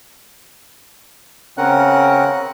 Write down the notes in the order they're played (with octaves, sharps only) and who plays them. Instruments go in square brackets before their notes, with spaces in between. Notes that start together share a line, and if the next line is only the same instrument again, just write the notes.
[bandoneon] C#3 C4 C#4 A#4 F#5 F#6